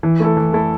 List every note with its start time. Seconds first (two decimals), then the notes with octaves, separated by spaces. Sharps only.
0.03 E3
0.20 A3 E4 A4
0.37 E3
0.53 A3 E4 A4